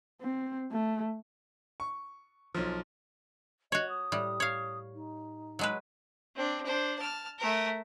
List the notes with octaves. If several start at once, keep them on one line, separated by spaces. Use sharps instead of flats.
C4
A3
C#6
B1 F3
F#4 C#5 D#5
D#6
A2 G3
C#5 F5
D#4
F#3 G#3 B4
C4 D4
D4 C5
A5 F6
A3 A#4